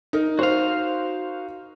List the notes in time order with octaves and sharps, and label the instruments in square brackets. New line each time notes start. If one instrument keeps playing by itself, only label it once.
[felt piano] D#4 A#4
[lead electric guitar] F#4 F5 [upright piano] C5